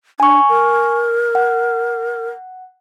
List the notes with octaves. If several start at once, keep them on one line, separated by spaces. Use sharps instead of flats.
D4 G#5 C#6
A#4
F#5